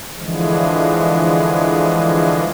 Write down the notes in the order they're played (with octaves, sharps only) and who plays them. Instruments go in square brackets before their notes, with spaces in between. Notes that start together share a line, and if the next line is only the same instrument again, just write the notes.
[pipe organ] D3 E3 F3 G#3